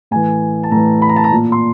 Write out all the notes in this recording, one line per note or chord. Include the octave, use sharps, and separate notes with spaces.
A2 E3 G#5
A5
A2 E3 A#5
B5
A#5
A5
A#5
A#2
C6